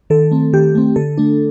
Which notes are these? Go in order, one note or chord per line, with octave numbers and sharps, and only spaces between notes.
D#3 A4
A3 C4
D#3 G4
A3 C4
D3 A4
A3 D4